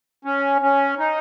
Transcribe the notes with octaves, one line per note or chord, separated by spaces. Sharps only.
C#4
C#4
D#4